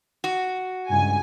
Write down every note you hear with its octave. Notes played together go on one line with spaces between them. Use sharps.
F#4
C#2 G2 G#5